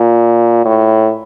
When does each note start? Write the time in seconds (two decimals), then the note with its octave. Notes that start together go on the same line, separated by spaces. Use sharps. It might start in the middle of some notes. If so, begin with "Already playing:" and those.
Already playing: A#2
0.65 A2